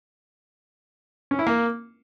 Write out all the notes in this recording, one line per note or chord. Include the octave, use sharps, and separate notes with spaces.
C#4
E4
A#3